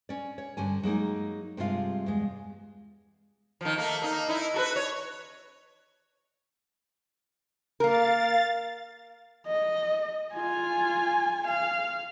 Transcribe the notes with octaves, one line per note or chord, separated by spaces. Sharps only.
C#4 D5
C#5
G2 D3 C#4 G#5
F#3 G#3 A#3 D#4
G2 C3 G#3 E4 F4 F5
E2 G#3
D#3 F3
A3 A#3
A#3 D#4
D#4 E4
F#4 A4 B4
C#5
A#3 A#4 F5 A6
D#5
F4 G#5
F5